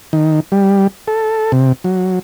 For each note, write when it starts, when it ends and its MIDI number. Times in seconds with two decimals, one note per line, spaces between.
0.13 0.40 51
0.52 0.87 55
1.08 1.52 69
1.52 1.73 48
1.84 2.19 54